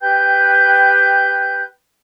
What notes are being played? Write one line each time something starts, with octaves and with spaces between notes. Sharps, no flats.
G4 B4 G5 G6